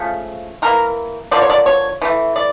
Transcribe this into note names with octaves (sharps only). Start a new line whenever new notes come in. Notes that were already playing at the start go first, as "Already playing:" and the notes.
Already playing: C#3 F3 A3
E3 A#3 A#4
D3 F3 A#3 D5
C#5
D5
C#5
E3 A3
D5